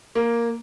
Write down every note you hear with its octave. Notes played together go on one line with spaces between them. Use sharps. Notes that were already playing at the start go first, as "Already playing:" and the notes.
A#3